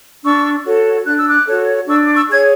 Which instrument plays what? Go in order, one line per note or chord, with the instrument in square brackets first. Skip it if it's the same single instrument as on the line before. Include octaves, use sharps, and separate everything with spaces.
[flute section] D4 C#6 E6
F#4 A4 C#5
D4 F#6
E6
D6 F#6
F#4 A4 C#5
D4 C#6 E6
D6
C#6 E6
G#4 C#5 G#6